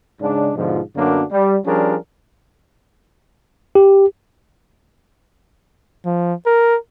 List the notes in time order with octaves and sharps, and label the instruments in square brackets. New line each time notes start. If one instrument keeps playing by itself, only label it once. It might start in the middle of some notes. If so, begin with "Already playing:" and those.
[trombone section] G#2 C#3 D4
G#2 B2 D3 F3
F#2 D3 F#3 A#3 B3 D4
G3
F3 G3 C#4 D4 G#4 A#4
[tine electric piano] G4
[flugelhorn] F3
A#4